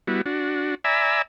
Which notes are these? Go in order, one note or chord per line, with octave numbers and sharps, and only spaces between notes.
G3 B3 E4 F#4
D4 F#4
D5 E5 G#5 A#5 B5 E6